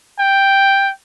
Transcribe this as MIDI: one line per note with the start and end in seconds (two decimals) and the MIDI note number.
0.20 0.91 79